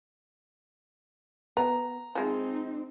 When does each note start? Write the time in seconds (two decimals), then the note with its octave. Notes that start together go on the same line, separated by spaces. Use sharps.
1.57 B3 A#5
2.15 F3 G#3 C4 D#4